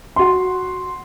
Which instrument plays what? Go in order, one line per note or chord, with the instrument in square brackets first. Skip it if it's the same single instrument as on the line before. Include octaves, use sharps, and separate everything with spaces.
[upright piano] F#4 C6